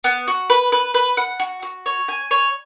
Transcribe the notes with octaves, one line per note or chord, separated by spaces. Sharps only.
B3
F#4
B4
B4
B4
F#5
F#4
F#4
C#5
G#5
C#5